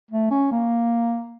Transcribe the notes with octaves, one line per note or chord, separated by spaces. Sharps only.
A3
C#4
A#3